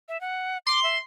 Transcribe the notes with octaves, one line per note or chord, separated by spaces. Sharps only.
E5
F#5
C6 D6
E5